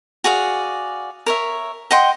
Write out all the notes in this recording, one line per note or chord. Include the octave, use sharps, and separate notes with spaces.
F#4 G#4 D5 F5
A#4 C#5 E5
D#5 F#5 G5 C6